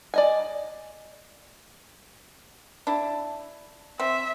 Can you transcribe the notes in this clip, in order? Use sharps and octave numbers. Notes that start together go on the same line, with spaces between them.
D5 D#5 G#5
D4 E4
C4 E5